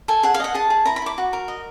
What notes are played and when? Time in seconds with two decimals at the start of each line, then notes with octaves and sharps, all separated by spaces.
0.08 A4 G#5
0.23 G#4 F#5
0.34 F5
0.40 D#5 F#5
0.55 G#4 A5
0.70 G#4
0.86 E4 A#5
0.96 B5
1.02 E4 D6
1.18 F#4
1.33 A#4
1.48 D#5